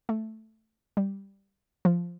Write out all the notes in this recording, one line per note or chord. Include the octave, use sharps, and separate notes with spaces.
A3
G3
F3